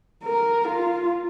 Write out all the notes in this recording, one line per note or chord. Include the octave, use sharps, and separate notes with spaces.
A#4
F4